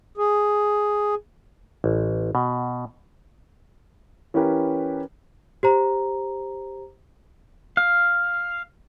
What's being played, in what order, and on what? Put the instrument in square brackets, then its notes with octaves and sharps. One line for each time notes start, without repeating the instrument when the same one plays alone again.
[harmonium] G#4
[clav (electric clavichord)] A1
B2
[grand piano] E3 C#4 E4 G4 A#4 B4
[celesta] G4 C5 A#5
[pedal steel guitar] F5